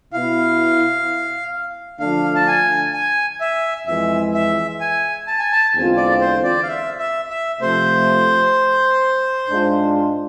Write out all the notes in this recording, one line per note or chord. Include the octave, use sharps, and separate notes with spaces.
B2 B3 E4 F5
D3 F3 A3 D4 F5
A5
G#5
G#5
E5
F2 E3 G#3 E5
E5
G#5
A5
G#5
A5
E2 D3 G#3 C4 F4
D5
C5
D5
F5
E5
E5
E5
C3 F3 A3 C5
G#2 G#3 D4 F4